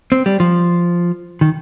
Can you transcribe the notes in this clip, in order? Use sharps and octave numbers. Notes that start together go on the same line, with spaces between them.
C4
G3
F3
D#3